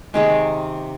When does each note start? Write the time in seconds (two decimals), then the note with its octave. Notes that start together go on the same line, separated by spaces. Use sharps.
0.14 C3 D#3 G#3 A#3